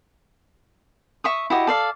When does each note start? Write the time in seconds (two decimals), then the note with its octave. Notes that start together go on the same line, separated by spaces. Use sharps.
1.24 E5 C#6 D#6
1.50 E4 F#4 G4 D#5
1.67 A4 D5 F5